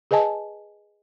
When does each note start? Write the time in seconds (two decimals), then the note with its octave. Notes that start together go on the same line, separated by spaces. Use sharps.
0.11 G#4 B4 D#5 G#5 A5